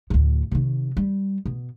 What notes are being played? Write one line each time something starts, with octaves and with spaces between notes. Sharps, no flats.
D2 A2
C3 D#3
G3
B2